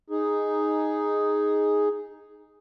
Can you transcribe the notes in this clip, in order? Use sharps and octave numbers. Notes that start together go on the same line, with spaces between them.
D#4 G#4